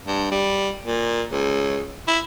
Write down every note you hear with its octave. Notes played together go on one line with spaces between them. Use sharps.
G2
G3
A#2
C#2
E4